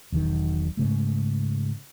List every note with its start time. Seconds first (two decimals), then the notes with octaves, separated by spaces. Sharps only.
0.12 E1 B1 D#3
0.77 G#2 C#3 A3